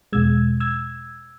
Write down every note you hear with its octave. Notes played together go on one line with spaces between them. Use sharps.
E2 B2 G#3 E6 G#6
E6 G#6